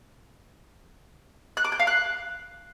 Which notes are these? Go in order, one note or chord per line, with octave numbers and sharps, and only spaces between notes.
F#6
D6
G6
F5
F#6